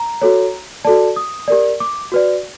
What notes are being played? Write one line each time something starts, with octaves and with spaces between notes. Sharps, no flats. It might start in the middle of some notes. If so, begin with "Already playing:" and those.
Already playing: A#5
F#4 A4 C#5
F#4 A4 D5 A5
D#6
G4 A#4 D5
D6
F#4 B4 D5